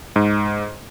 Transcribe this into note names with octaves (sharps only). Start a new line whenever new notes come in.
G#2